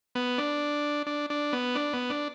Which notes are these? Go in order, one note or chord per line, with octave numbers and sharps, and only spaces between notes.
B3
D4
D4
D4
B3
D4
B3
D4